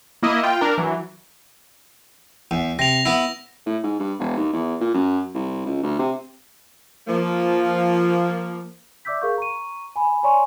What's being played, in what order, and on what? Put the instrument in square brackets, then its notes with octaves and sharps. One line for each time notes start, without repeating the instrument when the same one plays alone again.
[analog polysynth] A#3 E4 D#5
F4 G5
D4 A#4
E3 F#3
[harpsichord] E2
[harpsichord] C3 [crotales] A#6 F7
[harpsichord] B3 E4
[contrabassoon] A2
G#2
G2
E1
D#2
E2
A#2
F#2
C2
C#2
D2
C3
[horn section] F3 A#3
[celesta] D5 E5 D6 E6 G6 B6
G#4 A#4 F5 C#6 G6
A#5 C#6 D#7
G#5 B5
C#5 D5 G#5 A#5 C6 C#6